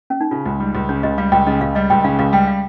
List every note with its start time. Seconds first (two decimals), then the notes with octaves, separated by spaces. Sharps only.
0.10 C#4
0.21 D#4
0.31 C#3 F4
0.46 C#2
0.60 G3
0.75 C#2
0.89 C#3 C#5
1.03 C#2 D#5
1.18 G3 F5
1.32 C#2 G5
1.47 C#3 D#5
1.61 C#2 F5
1.75 G3 D#5
1.90 C#2 G5
2.04 C#3 F5
2.19 C#2 F5
2.33 G3 G5
2.48 F5